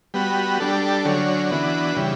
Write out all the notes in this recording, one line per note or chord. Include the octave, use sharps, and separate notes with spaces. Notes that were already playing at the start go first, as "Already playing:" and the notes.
G3 B3 F#4
G3 D4 A4
D3 F#3 C#4
E3 B3 D4 F#4
C#3 E3 G3